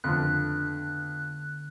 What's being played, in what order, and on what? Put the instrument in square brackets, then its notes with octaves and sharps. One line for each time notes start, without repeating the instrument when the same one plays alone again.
[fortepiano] F2 [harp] D3 A3 B3 [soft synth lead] F#6